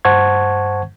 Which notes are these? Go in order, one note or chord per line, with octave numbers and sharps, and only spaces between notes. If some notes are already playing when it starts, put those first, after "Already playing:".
G2 C5 F#5 A5 C#6 G#6